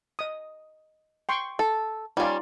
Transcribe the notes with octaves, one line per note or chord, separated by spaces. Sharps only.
D#5 D#6
G5 C6 C#6
A4
G3 C#4 D#4 F4 D5